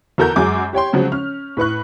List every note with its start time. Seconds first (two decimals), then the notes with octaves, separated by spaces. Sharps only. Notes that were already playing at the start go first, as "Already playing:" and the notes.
0.18 E2 F#4 A4 A#4 A#5 G6
0.36 F#2 F#3 G#3 G#5 D6
0.73 G4 C#5 G5 C6
0.93 C#3 F3 F#3 G#3
1.12 C#4 F6
1.57 A2 B4 C#6 F#6